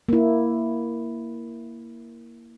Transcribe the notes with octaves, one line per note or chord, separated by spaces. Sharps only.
A#3 E4